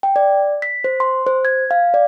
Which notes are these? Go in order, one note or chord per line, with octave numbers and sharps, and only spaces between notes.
G5
D5
B6
C5
C6
C5
G#6
F5
D5